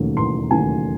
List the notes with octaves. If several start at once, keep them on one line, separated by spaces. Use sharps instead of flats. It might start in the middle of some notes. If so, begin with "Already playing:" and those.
Already playing: E1 D#2 C#3 F#3 A3
E1 C6
D#2 C#3 F#3 A3 G#5